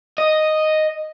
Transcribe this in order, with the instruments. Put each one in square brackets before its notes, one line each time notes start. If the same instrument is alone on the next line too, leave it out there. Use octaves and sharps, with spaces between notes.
[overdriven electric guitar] D#5